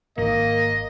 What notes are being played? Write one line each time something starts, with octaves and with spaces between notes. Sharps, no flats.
D#1 G#1 A#3 D#5